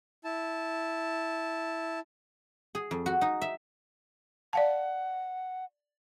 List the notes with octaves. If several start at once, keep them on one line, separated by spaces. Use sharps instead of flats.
E4 A5
G#4
F2
F#4
D#4
E5
D5 F5 F#5 A5